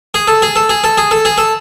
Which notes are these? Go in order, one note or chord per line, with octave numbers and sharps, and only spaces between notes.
G#4
A4
G#4
A4
G#4
A4
G#4
A4
G#4
A4